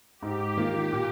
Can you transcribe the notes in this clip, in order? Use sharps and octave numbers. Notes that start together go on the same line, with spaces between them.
G#2 G4
D#3 A#3 F4
A#2